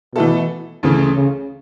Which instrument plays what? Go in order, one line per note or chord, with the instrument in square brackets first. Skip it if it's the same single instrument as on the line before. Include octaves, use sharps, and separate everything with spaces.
[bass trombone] B2 [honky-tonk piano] E3 A3 E4 A4
[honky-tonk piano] D2 C#3 E3 A3 C#4
[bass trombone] C#3